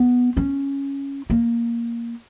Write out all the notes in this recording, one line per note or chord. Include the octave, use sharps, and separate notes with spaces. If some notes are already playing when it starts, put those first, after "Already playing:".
Already playing: B3
C#4
A#3